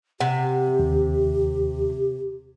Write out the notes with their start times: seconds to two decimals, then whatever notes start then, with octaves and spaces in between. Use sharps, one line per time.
0.20 C3 G4 F#5
0.79 D#2